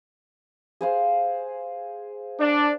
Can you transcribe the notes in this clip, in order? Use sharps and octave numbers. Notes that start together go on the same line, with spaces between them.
G#4 C5 F5
D4